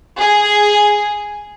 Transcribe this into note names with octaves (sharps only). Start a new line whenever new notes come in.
G#4